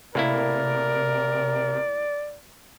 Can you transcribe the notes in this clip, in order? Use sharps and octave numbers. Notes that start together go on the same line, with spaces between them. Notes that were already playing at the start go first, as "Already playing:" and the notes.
A2 C3 A#3 E4 A#4 D5